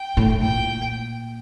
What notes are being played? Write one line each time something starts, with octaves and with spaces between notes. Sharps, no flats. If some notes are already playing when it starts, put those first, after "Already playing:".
Already playing: G5
A2
A#2 G5